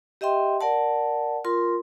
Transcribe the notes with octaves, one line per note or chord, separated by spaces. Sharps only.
G4 D#5 E5 G5 C6
A#4 D5 F#5 A5
F4 A#4 C6